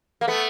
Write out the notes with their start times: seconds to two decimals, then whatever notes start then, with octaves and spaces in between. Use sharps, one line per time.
0.21 A#3
0.28 A3 B3